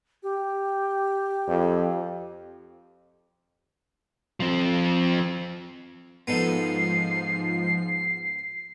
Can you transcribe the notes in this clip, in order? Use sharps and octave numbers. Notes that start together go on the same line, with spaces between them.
G4
F2
F3 C4
G#2 F3 B3 D#4 A4 C7